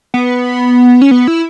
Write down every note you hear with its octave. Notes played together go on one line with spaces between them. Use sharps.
B3
C#4
B3
E4